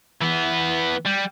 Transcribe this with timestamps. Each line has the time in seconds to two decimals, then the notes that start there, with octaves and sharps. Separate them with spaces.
0.22 E3 B3
1.05 G3